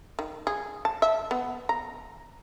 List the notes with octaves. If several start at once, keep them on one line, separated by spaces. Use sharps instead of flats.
D#3
G#4
A5
E5
B3
A#5